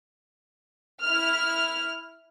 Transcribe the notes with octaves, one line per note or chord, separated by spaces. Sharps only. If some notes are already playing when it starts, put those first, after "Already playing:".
E4 F6